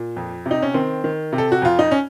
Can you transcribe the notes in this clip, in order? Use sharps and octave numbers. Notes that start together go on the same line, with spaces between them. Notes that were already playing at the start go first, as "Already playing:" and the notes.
Already playing: A#2
F2
C3
D#4
C#4
D#3 C4
D#3
C3
A4
F#4
F2 F4
D#4
C#4